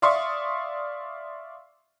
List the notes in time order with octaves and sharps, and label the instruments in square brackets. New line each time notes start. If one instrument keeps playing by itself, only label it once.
[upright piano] D5 E5 F5 C6 C#6 D#6